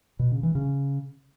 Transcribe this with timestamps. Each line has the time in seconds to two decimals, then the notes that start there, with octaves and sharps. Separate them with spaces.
0.19 B2
0.31 C#3
0.43 E3
0.55 C#3